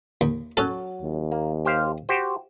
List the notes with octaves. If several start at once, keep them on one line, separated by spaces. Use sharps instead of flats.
D#2
F#3 C#4 A4
D#2
A#3
G4 C5 F5
F#4 G4 C5